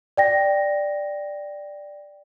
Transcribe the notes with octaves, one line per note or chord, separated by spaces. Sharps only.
D5 G5 A#6